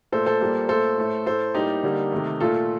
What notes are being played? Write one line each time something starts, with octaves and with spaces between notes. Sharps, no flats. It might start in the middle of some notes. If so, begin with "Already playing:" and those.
A#2 A3 A4 C5
A4 C5
A#2 G3 A#3
A#2 A3 A4 C5
A2 A3
A2 A3 A4 C5
A2 G3 A#3 D#4 G4
D3 G3 A#3
C3 D#3 A3
A#2 A3 F4 A4